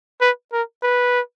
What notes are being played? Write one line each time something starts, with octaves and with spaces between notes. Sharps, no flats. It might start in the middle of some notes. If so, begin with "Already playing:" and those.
B4
A#4
B4